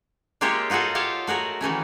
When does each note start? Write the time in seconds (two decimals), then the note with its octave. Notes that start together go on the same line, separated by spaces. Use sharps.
0.41 G#3 A#3 F4 G4 C#5 E5
0.70 D#4 F4 F#4 G#4 A4
0.95 G4 C5 C#5 F5 A5
1.27 A3 F#4 G#4 A#4
1.61 D#3 E3 A3 C#4